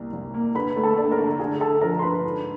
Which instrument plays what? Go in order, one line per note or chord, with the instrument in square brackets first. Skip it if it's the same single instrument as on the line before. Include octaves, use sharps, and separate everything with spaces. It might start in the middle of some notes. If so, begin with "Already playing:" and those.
Already playing: [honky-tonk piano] C2 A#3
C2
A#3
[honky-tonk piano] D3 [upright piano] B4 B5
[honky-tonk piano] A3
[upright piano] A4 A5
[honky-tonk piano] D4
[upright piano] A#4 A#5
[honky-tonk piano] D3
[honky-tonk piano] D3 [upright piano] G#4 G#5
[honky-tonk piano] D3 [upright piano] A4 A5
[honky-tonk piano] F3 [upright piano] A#4 A#5
[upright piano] C6
[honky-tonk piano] D3 [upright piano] B4 B5
[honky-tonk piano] G#2